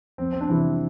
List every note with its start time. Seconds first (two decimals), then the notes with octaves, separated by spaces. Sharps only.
0.18 F2 C4
0.33 C4
0.41 D4
0.48 C3 E3 G3 E4